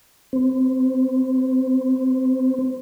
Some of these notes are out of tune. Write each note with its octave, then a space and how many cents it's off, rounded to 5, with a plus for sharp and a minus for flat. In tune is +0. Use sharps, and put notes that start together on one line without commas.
C4 -15